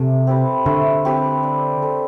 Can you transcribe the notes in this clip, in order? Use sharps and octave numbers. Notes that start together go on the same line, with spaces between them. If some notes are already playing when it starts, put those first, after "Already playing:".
Already playing: C3 A3
C4 G4 B4
D3 A3
C4 G4 B4
D4
A4 C5